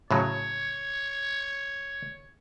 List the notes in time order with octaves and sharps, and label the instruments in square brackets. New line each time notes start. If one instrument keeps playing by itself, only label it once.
[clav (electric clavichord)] A2 C#3 F#3 [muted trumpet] C#5